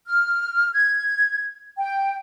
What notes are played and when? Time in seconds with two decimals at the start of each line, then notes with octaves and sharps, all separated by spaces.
0.07 F6
0.73 G#6
1.78 G5